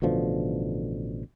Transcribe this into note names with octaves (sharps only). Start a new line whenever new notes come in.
A1 B2 D3 F3